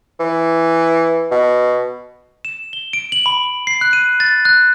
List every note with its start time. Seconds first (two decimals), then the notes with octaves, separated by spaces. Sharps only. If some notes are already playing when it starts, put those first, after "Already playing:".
0.20 E3
1.31 B2
2.45 E7
2.73 G7
2.93 D7
3.12 F#7
3.26 B5
3.67 C7
3.81 F#6
3.93 D#7
4.20 A6
4.45 F#6